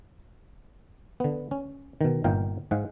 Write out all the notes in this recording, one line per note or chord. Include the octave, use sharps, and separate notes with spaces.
D3 B3
C#4
B2 D#3
G1 A#2 D#4 F5 G5
G#2 G#3 F5 F#5